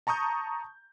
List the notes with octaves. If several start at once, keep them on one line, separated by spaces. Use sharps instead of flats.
A5 A#5 C#6 D#6 G6